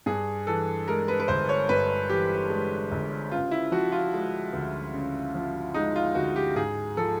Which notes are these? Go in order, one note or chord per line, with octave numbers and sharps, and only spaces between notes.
G2 G#4
E3 A4
G#3 A#4
B4
B4
G1 C5
C#5
G2 B4
E3 G4
G#3
G1
C#3 F4
E4
F3 F#4
F4
G#3
D2
C#3
F3
G#3 D#4
F4
D2 F#4
G4
G#2 G#4
F3 A4